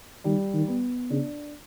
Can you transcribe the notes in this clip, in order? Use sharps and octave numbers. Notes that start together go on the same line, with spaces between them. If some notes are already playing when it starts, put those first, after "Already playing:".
D#3 G3
D#3
B3
C#3 D4